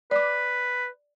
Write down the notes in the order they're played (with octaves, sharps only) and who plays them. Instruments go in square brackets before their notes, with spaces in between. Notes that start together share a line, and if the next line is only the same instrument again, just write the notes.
[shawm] B4 [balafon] D5 D6